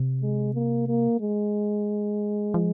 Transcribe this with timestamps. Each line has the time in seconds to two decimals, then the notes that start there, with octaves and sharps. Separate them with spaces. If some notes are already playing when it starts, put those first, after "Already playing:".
Already playing: C3
0.22 G#3
0.55 A#3
0.87 A#3
1.21 G#3
2.54 F3